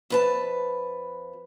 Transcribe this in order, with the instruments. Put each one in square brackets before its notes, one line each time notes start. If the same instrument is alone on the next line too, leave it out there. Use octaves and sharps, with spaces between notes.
[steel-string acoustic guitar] F2 B4 A5